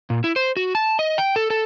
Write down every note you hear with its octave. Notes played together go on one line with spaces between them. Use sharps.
A#2
E4
C5
F#4
A5
D#5
G5
A4
A4